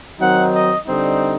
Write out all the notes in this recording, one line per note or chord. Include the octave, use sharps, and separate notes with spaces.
D#3 F#3 C4 D#4 F#5
D#5
D3 G3 C4 D#4